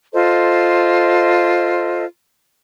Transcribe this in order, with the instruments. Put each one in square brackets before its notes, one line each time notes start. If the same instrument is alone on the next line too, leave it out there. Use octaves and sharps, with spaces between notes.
[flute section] F4 A4 C5 D#5